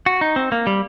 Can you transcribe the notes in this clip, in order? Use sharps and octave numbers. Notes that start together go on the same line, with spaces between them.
F#4
D#4
C4
A#3
G3